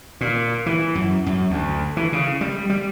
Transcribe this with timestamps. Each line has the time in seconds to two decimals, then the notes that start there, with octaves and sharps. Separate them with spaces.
0.21 A#2
0.66 E3
0.95 F#2
1.26 F#2
1.50 D2
1.97 E3
2.13 C#3
2.41 G3
2.70 G3